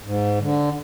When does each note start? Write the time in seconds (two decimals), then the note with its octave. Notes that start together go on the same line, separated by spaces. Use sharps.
0.04 G#2
0.39 D3